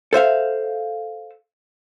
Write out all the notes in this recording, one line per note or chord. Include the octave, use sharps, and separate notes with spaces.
A4 C5 E5 F5